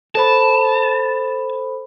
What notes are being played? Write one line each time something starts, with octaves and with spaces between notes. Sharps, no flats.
A4 C5 A5 B5